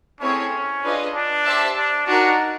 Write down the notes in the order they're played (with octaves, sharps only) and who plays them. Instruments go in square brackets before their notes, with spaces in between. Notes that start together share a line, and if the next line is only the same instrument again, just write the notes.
[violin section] A3 C4 E4 G#4 C#5 [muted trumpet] C#4
[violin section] D4 F4 G#4 B4 D#5
[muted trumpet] D4
[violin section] G4 C5 E5 A5
[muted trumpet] D4
[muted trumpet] D4 [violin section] D#4 F#4 A#4